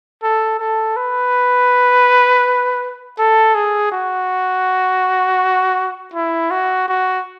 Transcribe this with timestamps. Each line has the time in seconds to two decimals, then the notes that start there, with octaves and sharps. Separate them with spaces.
0.23 A4
0.60 A4
0.96 B4
3.18 A4
3.55 G#4
3.92 F#4
6.14 E4
6.51 F#4
6.88 F#4